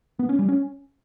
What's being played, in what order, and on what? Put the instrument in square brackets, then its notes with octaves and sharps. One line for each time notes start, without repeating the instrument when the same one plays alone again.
[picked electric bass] B3
C#4
G3
C#4